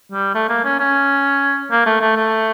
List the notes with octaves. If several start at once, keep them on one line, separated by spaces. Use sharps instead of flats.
G3
A3
A#3
C#4
C#4
A#3
A3
A3
A3